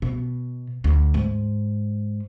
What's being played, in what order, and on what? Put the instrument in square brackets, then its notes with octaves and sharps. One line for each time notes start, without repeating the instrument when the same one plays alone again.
[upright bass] B2
D2
G#2